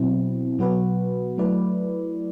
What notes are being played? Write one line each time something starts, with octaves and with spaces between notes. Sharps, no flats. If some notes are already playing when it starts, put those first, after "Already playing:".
Already playing: B2 F#3 C4 E4
B2 F#3 B3 F#4 B4
F#3 A3 E4 B4 D5